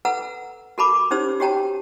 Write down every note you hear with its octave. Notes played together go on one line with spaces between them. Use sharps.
A4 B4 F#5 A#5 E6
F#4 A4 A#4 A5 B5 D6
C#4 D#4 G4 C5 C#5 E6
F#4 G4 C#5 G5 A5 A#5